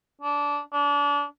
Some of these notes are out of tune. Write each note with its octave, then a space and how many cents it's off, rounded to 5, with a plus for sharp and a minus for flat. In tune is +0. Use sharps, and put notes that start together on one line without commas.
D4 -20
D4 -30